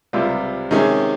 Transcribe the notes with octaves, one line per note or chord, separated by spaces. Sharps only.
C#2 C3 G3 C4 F4
C3 D#3 G#3 C#4 G#4